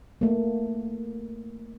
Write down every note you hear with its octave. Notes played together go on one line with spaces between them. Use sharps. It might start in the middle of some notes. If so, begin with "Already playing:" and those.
A3 A#3